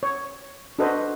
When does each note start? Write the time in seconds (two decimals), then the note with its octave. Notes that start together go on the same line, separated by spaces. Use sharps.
0.03 C#5
0.79 D4 F#4 A4 B4 C5 D#5